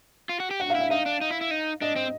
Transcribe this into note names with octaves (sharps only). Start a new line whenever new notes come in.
F4
F#4
G4
F#4 F#5
F5
E4
E5
D#4 F5
D4
D#4
E4
E4
D#4
D4 D#5
C4